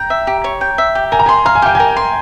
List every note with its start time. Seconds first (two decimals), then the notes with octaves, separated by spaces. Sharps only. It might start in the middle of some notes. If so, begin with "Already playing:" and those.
Already playing: G5 A#5
0.10 E5
0.27 G4
0.44 C#5
0.61 G5
0.78 E5
0.95 G4
1.12 A#4 G#5
1.19 A#5
1.26 G#5 C6
1.45 F5 A#5
1.55 G#5
1.62 G4 G5
1.75 A#4 G#5
1.97 C6